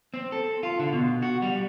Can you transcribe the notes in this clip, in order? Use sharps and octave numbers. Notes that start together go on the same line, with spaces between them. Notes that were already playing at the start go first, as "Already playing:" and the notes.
C4
A4
F4
D3
B2
F#4
G3